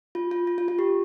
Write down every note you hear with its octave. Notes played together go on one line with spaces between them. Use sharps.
F4
F4
F4
F4
F4
G4